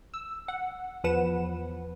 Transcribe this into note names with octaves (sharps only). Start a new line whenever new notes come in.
E6
F#5
E2 F3 B4 F#5 E7